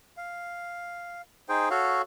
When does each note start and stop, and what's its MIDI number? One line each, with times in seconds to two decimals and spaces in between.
0.17 1.22 77
1.49 1.69 63
1.49 1.69 68
1.49 1.69 72
1.49 1.69 79
1.70 2.02 66
1.70 2.02 69
1.70 2.02 73
1.70 2.02 77